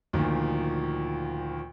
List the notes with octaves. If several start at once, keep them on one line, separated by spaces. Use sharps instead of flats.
D2 A#2 D#3 F3